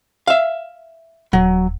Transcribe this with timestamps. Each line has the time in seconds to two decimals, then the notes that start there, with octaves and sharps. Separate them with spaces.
0.27 E5 F5
1.33 D#1 F#3